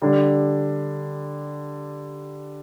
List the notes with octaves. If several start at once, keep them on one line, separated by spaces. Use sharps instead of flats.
D3 G3 D4